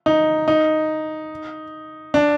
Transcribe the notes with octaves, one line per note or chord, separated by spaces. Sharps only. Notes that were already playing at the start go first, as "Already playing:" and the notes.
D#4
D#4
D4